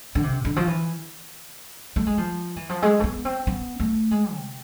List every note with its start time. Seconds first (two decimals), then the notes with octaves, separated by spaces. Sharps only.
0.15 D3
0.23 C3
0.45 D3
0.56 F3
0.67 E3
1.96 A3
2.06 G#3
2.18 F3
2.56 E3
2.69 F3
2.82 G#3
2.99 A3
3.04 B3
3.25 C4
3.47 B3
3.80 A3
4.11 G#3
4.34 C3